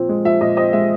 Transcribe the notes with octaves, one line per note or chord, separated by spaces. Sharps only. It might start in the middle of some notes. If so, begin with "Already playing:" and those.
Already playing: A#2 F3 C4
G#3
F3 E5
A#2 D#5
C4 D#5
G#3 E5